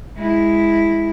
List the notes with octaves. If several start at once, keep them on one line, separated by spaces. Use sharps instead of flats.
G#3 E4